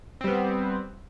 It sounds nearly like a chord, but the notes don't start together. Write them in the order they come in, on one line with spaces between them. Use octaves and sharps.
C4 G3 B3